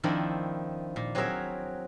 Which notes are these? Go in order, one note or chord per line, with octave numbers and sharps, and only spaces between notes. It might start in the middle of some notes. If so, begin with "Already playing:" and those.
D#3 F3 C4 D4 E4 A#4
A#2
F#3 C4 F#4 G#4 A#4 E5